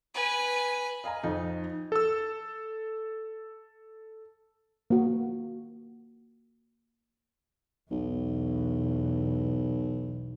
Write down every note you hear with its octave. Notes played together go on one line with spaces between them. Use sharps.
B4 G#5
D#5 F5 G#5 A#5
F2 D#4
A4 E6
A#3 F#4
B1 E2 B2